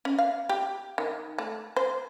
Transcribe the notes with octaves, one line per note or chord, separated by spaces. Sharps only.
C#4
F5
G4
D#3
A3
C5